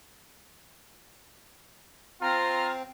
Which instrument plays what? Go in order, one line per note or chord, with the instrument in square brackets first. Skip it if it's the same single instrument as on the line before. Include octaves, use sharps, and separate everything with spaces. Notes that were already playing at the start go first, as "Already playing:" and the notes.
[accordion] C4 [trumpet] F4 [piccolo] A#5 [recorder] F6